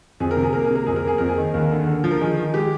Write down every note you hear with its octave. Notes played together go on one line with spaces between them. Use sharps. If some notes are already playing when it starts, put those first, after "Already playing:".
F2 G#4
A#4
C3
G#4
A#3 A#4
G#4
C3 A#4
F2 G#4
A#4
A#3 G#4
F2 A#4
G#4
D#3
D#2 A#4
D3
D3
F3
A#4
D#3 G#4
D#3
G#3 G4